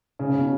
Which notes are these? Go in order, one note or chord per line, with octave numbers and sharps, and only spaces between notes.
C#3
C#3
B2